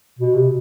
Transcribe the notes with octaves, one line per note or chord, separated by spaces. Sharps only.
B2
C3